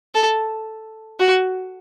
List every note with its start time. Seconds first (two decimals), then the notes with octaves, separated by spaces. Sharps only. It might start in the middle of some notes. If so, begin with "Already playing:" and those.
0.15 A4
1.20 F#4